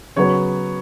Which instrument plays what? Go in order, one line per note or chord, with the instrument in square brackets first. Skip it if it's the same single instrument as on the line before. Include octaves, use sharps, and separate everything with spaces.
[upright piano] C#3 F#3 B3 C#5